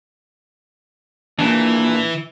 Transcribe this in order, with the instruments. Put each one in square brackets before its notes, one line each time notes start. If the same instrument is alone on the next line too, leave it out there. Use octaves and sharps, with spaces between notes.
[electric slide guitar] A#2 D4 [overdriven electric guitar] E3